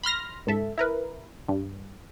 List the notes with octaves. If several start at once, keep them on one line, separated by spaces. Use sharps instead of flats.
B5 C6 F6 A#6
C#2 G#2 A4 E5
E4 A#4 B4
G2